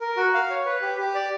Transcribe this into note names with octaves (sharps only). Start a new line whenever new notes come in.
A#4
F#4
F5
C#5
B4
G4
G4
D5